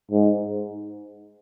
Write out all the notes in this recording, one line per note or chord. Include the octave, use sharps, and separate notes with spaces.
G#2